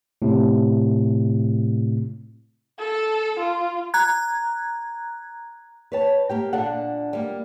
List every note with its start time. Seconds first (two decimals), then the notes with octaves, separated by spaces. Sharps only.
0.22 A2 C3
2.79 A4 A5
3.39 F4
3.94 A#5 F#6 G#6
5.92 B4 C#5 A5
6.29 A#3 G4 G5
6.53 A#2 D3 D4 A4 F5 F#5
7.13 G3 A#3